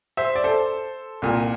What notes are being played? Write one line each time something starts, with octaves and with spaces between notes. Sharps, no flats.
C5 E5
D5
A4 C5
C2 A#2